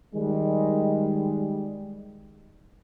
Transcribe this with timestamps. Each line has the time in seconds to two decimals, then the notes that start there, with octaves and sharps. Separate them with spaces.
0.14 D#3 G3 G#3